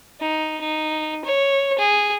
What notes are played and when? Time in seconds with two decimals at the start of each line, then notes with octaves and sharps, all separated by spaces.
0.20 D#4
0.60 D#4
1.25 C#5
1.79 G#4